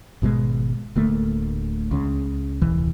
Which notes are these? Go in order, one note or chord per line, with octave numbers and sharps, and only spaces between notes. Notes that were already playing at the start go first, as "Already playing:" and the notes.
G#1 B2 E3 G#3
D1 D2 A3 A#3
C#2 C#3
D#1 C2 E3